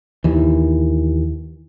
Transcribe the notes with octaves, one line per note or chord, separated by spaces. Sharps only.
D#2 E3